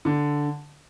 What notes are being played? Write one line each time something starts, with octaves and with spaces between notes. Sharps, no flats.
D3